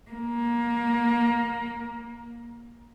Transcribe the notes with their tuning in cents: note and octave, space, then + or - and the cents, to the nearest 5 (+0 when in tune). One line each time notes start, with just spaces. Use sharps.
A#3 +20